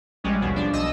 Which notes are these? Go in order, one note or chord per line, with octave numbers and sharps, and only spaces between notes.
A#1 G3 G#3 C#4
D#2 B2
F3 D4
B1 D#5 E6